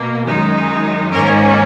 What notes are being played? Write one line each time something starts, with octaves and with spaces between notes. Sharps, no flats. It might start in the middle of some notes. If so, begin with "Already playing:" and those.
Already playing: B2 A#3
F#2 D#3 G#3 D#4
G#2 D#3 A#3 C#4 A#4